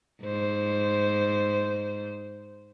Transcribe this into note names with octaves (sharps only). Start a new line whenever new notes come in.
G#2 C5